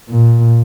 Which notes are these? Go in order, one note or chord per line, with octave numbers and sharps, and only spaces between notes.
A#2